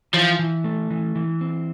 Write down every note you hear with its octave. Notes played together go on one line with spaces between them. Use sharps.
E3 F3
E3
A3
E3
E3
C4